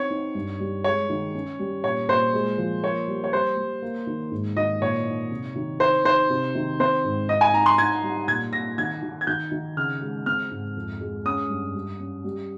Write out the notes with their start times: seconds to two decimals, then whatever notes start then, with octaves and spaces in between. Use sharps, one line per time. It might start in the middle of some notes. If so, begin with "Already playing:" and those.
Already playing: C4 D#4 C#5
0.11 D#4
0.35 G2
0.60 G3
0.84 G#3 C#5
1.10 D#3
1.35 C#4
1.59 G3
1.84 A#2 C#5
2.09 A#2 C5
2.34 G#3
2.58 F3
2.83 A#3 C#5
3.08 G3
3.24 C#5
3.32 G3 C5
3.57 G3
3.82 A#3
4.07 D#3
4.31 G#2
4.57 D#3 D#5
4.81 A#2 C#5
5.06 D#4
5.31 C3
5.56 D#3
5.80 D#4 C5
6.05 D#4 C5
6.30 C3
6.55 D#3
6.79 C4 C5
7.04 G#2
7.29 D#4 D#5
7.41 G#5
7.53 D#4 A#5
7.66 C6
7.78 D#4 G#6
8.03 G3
8.28 A#2 G#6
8.53 A#2 A#6
8.78 D#3 G#6
9.03 D#3
9.21 G#6
9.27 D#3 G6
9.52 D#3
9.77 C#3 F6
10.01 G#3
10.26 C4 F6
10.51 G#2
10.76 F2
11.01 G#3
11.25 C#4 D#6
11.50 G2
11.74 G3
12.00 C#4
12.24 G3